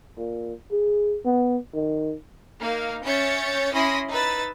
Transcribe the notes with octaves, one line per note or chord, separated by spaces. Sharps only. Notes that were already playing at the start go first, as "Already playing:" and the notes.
A#2
G#4
B3
D#3
A#3 D#4 F5
C#4 C#5 E5 G6 A6 C#7
C#4 E4 B5 C6 D#6 A#6
D#4 B4 E6 A6